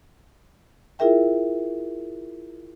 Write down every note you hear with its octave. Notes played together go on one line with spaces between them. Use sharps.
E4 F4 G#4 A#4 E5 G5